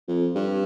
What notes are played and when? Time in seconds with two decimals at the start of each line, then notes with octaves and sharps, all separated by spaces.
0.08 F2
0.35 G2